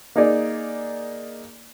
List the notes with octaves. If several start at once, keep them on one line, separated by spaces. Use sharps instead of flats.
A#3 D#4 G#4 D5